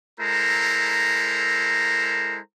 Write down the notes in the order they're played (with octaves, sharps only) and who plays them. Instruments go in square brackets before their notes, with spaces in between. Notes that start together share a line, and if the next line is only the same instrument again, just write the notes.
[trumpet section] G#3 E4 A4 A#4 C5 A#5